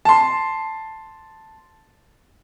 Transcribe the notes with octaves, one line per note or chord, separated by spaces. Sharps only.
A5 C6